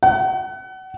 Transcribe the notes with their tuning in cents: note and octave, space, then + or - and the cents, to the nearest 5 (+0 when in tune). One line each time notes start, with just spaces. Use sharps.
F#5 +30